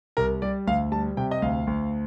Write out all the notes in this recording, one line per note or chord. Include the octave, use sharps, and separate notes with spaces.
C2 A#4
G3 D5
D2 F5
G3 A5
C3 G5
D#5
D2 F5
D2